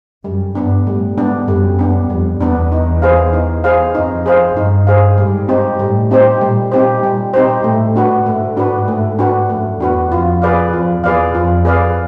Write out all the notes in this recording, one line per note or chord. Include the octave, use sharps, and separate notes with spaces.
F#2 G3
G2 B3 D4
A2 G3
G#2 B3 D4
F#2 G3
B3 D4
F2 G3
E2 B3 D4
D#4
G#4 C5 F5
D#4
G#4 C5 F5
F2 D#4
G#4 C5 F5
G2 D#4
G#4 C5 F5
G#2 G3
C4 D#4 G4 C5
A2 G3
C4 D#4 G4 C5
A#2 G3
A#2 C4 D#4 G4 C5
A#2 G3
C4 D#4 G4 C5
A2 A3
D4 F#4 B4
G#2 A3
D4 F#4 B4
A3
D4 F#4 B4
F#2 A3
E2 D4 F#4 B4
F2 F4
G#4 B4 D5 F5
F2 F4
E2 G#4 B4 D5 F5
F2 F4
G#4 B4 D5 F5